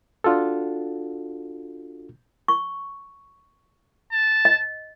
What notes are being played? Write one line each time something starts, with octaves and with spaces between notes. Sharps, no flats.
D4 F4 F#4 A4
C#6
A5
D#5